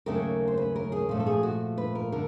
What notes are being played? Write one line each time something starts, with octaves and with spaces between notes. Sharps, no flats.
D#2 C#3 F#3 A3 C#4 A#4
C5
B4
A#4
G#4
A#2 F3 A3
A4
G#4
F#4
B4
A#4
D3 A#4